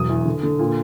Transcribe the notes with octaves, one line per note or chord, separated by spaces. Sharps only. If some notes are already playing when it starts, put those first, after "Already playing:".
Already playing: E1 F#3 D#6
E2
D3
D3
A#2